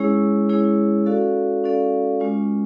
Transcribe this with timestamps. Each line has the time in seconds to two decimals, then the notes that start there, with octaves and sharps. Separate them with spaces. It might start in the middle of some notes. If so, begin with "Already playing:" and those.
Already playing: G#3 C#4 E4 G#4 C#5
0.49 G#3 C#4 E4 G#4 C#5
1.06 C#4 F#4 A4 D5 F5
1.64 C#4 F#4 A4 D5 F5
2.20 G#3 C#4 F4